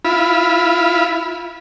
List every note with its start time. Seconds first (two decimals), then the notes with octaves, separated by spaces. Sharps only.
0.05 E4 F4 B5